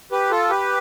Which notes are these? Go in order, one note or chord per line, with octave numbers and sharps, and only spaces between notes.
G4 B4
F4 A4
G4 B4